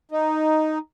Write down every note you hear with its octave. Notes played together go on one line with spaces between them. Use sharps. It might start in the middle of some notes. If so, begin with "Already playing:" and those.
D#4